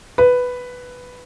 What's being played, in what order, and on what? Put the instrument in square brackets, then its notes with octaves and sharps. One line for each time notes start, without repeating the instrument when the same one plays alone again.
[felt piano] B4